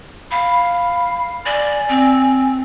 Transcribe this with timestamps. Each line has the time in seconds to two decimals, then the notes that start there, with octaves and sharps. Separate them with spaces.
0.31 F5 B5
1.46 D5 G#5
1.89 C4